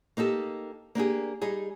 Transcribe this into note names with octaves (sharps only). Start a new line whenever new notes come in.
A#3 D#4 G4 A4
A#3 D4 G4 G#4
G3 D#4 G#4